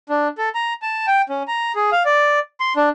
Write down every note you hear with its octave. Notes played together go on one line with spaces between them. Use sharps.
D4
A4
A#5
A5
G5
C#4
A#5
G#4
F5
D5
C6
D4